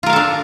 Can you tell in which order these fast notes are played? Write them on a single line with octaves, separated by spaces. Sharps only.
F4 A#4 F5 A4 D4